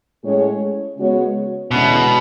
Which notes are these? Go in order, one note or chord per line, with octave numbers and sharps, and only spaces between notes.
A2 G#3 C#4 G#4 C#5
C#3 G#3 B3 F#4 C#5
E2 B2 D3 G#3 C#4 E4